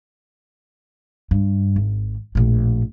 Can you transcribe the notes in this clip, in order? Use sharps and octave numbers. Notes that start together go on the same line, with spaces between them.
G2
G#1
A#1 A2